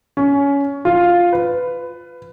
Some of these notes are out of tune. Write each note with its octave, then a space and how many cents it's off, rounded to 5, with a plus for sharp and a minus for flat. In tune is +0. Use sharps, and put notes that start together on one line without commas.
C#4 +20
F4 +5
B4 +15